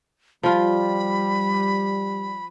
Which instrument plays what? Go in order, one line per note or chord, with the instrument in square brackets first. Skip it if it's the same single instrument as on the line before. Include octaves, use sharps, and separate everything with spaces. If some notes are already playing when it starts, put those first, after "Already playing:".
[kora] F3 F4 [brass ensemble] G3 [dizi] B5